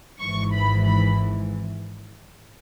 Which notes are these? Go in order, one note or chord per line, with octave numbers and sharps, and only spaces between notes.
G#1 G#2 E3 C#6
B5
B5